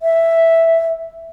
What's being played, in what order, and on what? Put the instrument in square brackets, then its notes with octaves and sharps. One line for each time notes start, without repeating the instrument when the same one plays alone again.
[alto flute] E5